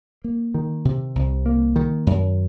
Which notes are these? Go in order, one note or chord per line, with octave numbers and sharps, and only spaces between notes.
A#3
D#3
C3
C2
A#3
D#3
F#2